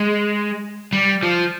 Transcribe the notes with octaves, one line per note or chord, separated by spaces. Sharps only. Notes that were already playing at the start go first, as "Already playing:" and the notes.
Already playing: G#3
G3
F3